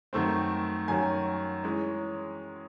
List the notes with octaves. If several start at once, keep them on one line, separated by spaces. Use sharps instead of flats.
F#2 D#3 A3 C4
F#2 D#3 F#3 C#4 G#5
E3 G#3 C#4